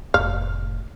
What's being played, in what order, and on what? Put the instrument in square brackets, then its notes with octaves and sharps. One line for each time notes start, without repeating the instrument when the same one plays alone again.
[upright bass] F1 A2 [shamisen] F5